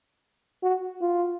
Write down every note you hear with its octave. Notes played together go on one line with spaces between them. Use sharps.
F#4
F4